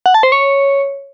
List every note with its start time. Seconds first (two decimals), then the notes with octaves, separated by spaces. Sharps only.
0.06 F#5
0.14 A5
0.23 C5
0.32 C#5